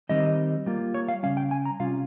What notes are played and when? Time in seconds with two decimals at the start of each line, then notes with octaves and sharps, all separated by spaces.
0.09 D#3 G3 C4 D#4 D#5
0.66 G3 A#3 F4
0.94 C#5
1.09 F5
1.23 C#3 G3 C#4 F5
1.37 G5
1.51 G#5
1.65 A#5
1.80 C3 G3 C#4 F4 F5